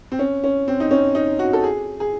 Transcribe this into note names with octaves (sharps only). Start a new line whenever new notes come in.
C4
C#4
C#4
C4
D#4
C#4
D#4
F#4
A4
G#4
G#4